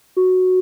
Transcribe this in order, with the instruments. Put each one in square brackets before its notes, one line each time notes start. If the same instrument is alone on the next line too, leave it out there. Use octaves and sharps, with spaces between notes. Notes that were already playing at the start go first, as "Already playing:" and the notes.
[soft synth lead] F#4